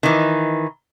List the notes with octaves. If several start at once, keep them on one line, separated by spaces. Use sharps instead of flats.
D#3 E3